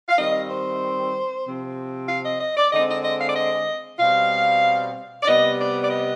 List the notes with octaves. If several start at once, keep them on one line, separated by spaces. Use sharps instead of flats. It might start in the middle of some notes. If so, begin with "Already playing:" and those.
F5
D#3 G3 C4 D#5
C5
C3 F3 C4
F5
D#5
D#5
D5
D3 G#3 C4 D#5
D#5
D#5
F5
D5
D#5
B2 G3 C4 F5
D5
C3 G3 B3 D#5
D5
D5
D#5